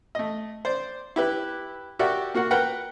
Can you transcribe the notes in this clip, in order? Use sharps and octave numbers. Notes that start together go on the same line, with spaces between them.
A3 D#5
C5 D5
E4 G4 B4
F#4 G4 A#4 D5 E5 F#5
A#3 F#4 A#4 F#5
A#4 B4 F#5 G5